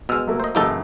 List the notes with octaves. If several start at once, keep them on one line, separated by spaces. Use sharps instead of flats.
B2 G#3 E6 F6
F#3 A3 A#3
C5 D#5
F#2 C#3 E3 A#3 D#4 A4